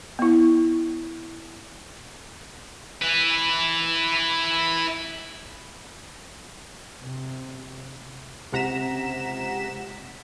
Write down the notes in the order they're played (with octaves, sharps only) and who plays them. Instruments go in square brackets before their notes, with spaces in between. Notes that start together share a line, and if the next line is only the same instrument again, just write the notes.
[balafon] B3 E4
[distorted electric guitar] E4 B4
[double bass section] C3
[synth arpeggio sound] C#2 C3 F#5 A#5 B6 E7